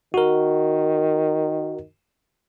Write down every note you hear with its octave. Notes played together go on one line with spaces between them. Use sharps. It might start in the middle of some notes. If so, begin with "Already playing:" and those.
D#3 F#4 A#4